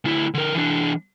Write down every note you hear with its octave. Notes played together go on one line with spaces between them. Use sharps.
D2 E4
D3 A#4
E3 D4